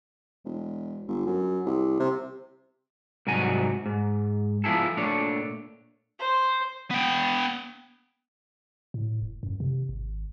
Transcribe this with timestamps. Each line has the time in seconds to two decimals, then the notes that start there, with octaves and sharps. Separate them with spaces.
0.45 E1
1.08 G1
1.26 F#2
1.66 C2
2.00 C3
3.27 C2 G#2 F#3 F#4 G#5
3.86 G#2
4.64 F3 B3 E4 G#4 A4
4.97 A#2 A3 D4 C#5
6.20 C5
6.91 B3 G5
8.94 A2
9.22 E1
9.43 F#2
9.60 C3
9.89 G#1